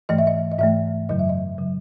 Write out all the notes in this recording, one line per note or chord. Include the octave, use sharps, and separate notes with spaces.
G#2 E3 A3 D#5
E5
D#5
D#5
G#2 E3 A3 E5
F#2 C#3 F#3 D#5
E5
D#5
C#3 F#3